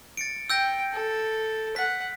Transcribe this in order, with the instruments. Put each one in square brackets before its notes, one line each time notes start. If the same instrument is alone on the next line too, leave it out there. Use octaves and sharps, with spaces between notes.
[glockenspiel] A6 C#7 D7
[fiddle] G5 [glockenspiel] E6 G6 A#6
[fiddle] A4
[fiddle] F#5 [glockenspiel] B6